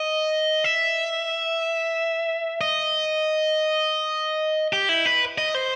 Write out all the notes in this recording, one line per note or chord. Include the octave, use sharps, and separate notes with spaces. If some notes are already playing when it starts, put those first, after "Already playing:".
Already playing: D#5
E5
D#5
G4
E4
B4
D#5
C5